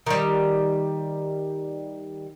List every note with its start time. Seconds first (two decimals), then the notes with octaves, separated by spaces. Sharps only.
0.06 D#3 G3